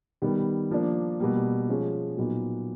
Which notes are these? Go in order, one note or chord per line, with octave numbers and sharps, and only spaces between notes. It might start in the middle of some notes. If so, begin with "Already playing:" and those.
D#3 G3 B3
F3 A#3 D4
B2 G3 A#3
F3 G#3 C#4
A#2 F#3 B3 D#4